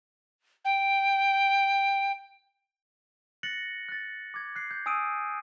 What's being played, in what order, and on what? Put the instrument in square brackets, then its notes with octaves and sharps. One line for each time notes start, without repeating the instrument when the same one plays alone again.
[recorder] G5
[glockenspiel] F#6 A6 A#6 C#7 F#7
F#6 A6
D6 G#6
F#6 C7
G6
G#5 D#6 E6 D7 D#7